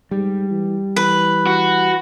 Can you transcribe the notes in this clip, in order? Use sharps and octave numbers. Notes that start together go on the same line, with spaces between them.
G#2 G3
E3
E3 B4
F#4